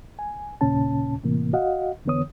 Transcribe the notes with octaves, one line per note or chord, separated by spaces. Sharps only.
G#5
D#2 A#2 C#3 C#4 A5
A2 C3 E3 A#3
F#4 D#5 F5 F#5
F2 D3 E3 B3 C#5 D#6